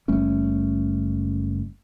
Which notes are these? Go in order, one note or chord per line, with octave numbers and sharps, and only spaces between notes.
F#1 G3 A3 C#4